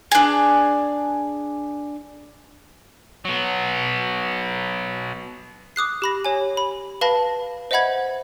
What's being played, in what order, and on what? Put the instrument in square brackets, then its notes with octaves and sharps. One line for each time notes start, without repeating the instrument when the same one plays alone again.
[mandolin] D4 G#4
[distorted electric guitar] F#3 B3
[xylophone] D6 D#6 F#6 C7
G4 B5 A#6
G4 C#5 G#5
B5
B4 F5 A5 B5 A#6
C5 D#5 E5 F#5 B5 G#6